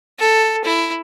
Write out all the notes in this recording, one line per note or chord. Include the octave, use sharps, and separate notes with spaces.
A4
E4